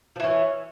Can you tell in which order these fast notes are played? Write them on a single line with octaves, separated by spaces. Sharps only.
F3 E3 C#4